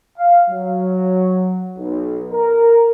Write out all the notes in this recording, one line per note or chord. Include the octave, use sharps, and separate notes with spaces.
F5
F#3
B1
A#4